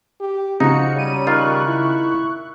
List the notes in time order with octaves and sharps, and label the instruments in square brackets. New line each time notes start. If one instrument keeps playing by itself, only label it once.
[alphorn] G4
[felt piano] C#3 [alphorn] F3 [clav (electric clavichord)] D#4 F#4 [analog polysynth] F5 C#7
[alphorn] G3 [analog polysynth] C#5 D#7
[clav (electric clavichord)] D#3 F4 [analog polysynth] C#6 F#6
[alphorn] E4